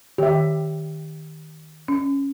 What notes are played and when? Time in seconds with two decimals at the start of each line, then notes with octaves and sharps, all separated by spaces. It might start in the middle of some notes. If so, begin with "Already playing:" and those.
0.18 D#3 G4 E5
1.88 C#4